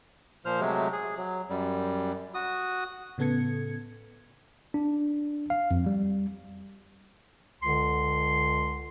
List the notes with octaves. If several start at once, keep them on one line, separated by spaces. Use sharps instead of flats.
A#2 F3 C5 F6
C3 F#3 G#3 A3
G#4
F#3
F#2 G3
F#4 D#6
A2 C#3 B3 A4 G#6 C#7
D4
F5
F2
G3
C#2 D3 C6